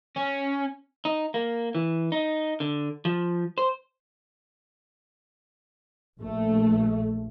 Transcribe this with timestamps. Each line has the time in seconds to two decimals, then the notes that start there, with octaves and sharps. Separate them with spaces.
0.16 C#4
1.05 D#4
1.34 A#3
1.75 E3
2.12 D#4
2.60 D3
3.05 F3
3.58 C5
6.19 A#1 A3